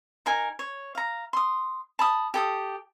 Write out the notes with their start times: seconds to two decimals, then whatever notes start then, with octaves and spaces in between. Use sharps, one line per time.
0.26 D#4 A#4 G#5
0.59 C#5
0.95 F5 A#5
1.33 C6 D#6
1.99 A5 B5 D#6
2.34 G4 A4 D#6